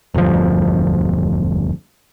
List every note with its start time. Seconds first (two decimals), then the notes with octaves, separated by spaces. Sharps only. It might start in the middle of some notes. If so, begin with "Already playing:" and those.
0.14 E1 D2 G2 F3